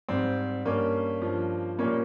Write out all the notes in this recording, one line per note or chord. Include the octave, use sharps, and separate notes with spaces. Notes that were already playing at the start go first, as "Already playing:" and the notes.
G#2 G3 C4
G2 G3 A#3 C#4
G2 F3
A#2 G3 A#3 C#4